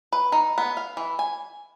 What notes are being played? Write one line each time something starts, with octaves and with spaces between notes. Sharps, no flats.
B4
D#4
B3
F5
E3
G#5